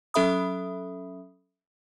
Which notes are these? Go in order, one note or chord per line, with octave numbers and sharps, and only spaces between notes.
F#3 C#4 A4 E5 B5 D#6